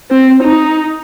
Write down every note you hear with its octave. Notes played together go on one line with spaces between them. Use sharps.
C4
D#4